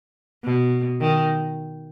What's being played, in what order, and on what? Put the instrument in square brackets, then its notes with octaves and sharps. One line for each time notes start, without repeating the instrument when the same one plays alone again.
[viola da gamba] B2
D#3